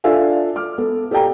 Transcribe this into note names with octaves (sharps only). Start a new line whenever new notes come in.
D4 F4 A4 E5 F5 G#5
D6 F6
B3 A4
G4 A4 D5 F5 G5 A#5